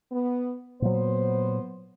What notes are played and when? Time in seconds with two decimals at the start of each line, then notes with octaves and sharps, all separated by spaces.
0.12 B3
0.82 A#2 F#3 B3 C5